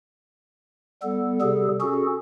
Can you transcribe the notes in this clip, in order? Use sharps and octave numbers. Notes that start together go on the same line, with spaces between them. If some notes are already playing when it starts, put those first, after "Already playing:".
G3 B3 A4
C3 G3 G#4 A4
C#4 F#4 G#4 A4